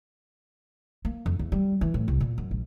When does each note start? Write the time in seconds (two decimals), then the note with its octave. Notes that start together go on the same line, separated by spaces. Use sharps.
1.05 A#3
1.26 F2
1.39 E2
1.52 G3
1.81 E3
1.94 A2
2.08 C2
2.20 A#2
2.38 F#2
2.51 A#1